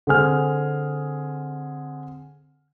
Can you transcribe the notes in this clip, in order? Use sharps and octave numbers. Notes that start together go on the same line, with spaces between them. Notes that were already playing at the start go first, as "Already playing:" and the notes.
D3 C4 G#4 F6